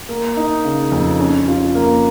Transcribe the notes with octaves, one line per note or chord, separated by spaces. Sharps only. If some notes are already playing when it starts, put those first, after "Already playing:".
A#3
D#4
C#3
F2
C#4
F4
A#3